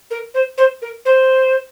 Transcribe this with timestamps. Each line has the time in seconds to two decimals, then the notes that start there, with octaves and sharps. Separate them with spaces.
0.11 A#4
0.34 C5
0.58 C5
0.82 A#4
1.05 C5